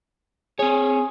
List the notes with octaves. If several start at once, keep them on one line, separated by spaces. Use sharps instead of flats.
C4 G#4 C#5